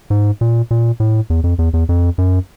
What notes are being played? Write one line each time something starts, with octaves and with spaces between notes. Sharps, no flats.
G#2
A#2
A#2
A2
E2
F2
E2
E2
F2
F#2